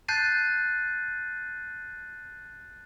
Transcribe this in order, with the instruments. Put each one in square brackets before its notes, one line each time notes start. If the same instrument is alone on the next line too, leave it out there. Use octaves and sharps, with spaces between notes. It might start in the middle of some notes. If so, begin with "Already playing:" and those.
[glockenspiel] A5 F#6 G6 A6 C7 D#7